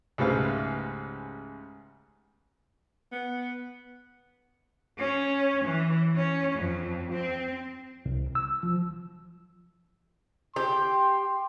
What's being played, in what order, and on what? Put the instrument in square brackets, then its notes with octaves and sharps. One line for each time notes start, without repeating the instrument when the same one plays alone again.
[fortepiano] C#2 G#2 G3 A3 B4 F5
[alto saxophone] B3
[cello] C#4
E3
C#4
F2
C4
[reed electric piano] C2
E6
F3
[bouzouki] G4 [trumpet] C6